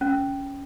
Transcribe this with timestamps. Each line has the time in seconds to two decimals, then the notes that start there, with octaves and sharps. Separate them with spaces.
0.01 C#4